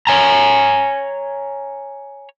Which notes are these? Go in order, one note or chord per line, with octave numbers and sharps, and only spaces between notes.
C#5 G#5 A#5